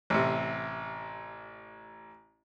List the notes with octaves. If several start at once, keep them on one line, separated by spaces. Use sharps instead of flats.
A1 C3